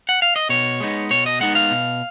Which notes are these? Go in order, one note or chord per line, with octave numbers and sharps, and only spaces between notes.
F#5
F5
D#5
B2 C#5
G#3 B3 D#4
B2 C#5
D#5
G#3 B3 D#4 F#5
F5
B2